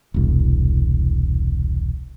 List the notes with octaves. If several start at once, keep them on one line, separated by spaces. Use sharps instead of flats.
E1 C2